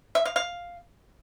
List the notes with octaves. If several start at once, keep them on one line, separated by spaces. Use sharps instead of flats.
E5
F5
F5